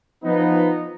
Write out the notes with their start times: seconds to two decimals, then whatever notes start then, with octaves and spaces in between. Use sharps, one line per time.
0.24 F3 B3 D#4